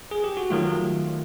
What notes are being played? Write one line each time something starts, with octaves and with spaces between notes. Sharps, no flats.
G#4
G4
F#4
D#3 F#3 A3 F4